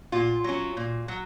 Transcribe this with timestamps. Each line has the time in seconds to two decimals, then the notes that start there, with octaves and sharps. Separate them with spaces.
0.12 A#2 F4
0.44 F#3 C#4
0.77 A#2
1.08 F#3